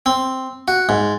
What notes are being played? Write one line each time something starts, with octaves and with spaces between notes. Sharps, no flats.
C4
F#4
G#2